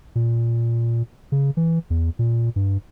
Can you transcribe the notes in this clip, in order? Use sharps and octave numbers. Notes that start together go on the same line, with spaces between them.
A#2
C#3
E3
E2
A#2
G2